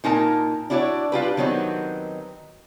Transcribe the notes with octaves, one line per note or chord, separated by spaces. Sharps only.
A#2 D#4 A#4 A5
D4 E4 F#4 C#5 D5
D4 F4 G4 B4
D#3 F#3 B3 C4 D#4